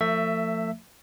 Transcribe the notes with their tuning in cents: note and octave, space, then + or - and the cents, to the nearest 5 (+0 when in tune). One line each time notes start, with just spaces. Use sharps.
F3 +0 A3 +30 E5 +5